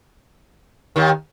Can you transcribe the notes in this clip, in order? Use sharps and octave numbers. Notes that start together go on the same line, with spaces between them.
D#2 D#3